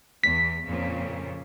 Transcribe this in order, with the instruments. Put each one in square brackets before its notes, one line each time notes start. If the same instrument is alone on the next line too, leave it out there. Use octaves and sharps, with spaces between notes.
[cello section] E2 [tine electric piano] B6
[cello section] F2 A#2 C#3